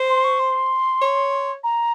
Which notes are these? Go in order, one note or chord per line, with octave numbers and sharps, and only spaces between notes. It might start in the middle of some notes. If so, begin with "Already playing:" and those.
Already playing: C5
C6
C#6
C6
C#5
A#5